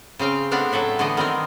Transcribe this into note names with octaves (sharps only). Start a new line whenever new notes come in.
C#3 C4 F5 G5
A3 B3 C4 D4 F5 F#5
A2 F#3 A4 E5 F#5
D3 E3 A3 B3 D#5
D#3 G3 C4 A#4